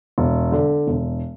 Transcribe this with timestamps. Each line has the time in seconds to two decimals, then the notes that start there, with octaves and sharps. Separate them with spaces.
0.18 E1
0.52 D3
0.87 E1